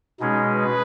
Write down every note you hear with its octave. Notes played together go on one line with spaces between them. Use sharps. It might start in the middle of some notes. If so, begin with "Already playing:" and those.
B2 G#3 C#4 D#4 G#4
B4